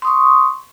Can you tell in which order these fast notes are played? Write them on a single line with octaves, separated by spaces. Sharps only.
C6 D#6 C#6